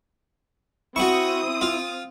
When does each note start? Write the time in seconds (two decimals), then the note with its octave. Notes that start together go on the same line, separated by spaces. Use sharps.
0.96 C4 E4 F#4 C#6 D#6
1.61 F4